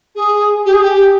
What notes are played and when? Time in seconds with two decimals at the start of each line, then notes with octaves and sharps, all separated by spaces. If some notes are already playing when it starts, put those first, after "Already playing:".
0.15 G#4
0.65 G4
0.73 G#4
0.81 G4